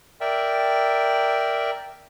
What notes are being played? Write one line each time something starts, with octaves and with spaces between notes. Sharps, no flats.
A#4 D5 E5 G5